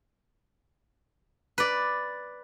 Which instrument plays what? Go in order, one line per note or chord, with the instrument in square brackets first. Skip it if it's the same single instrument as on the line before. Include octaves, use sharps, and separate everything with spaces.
[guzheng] B4 D5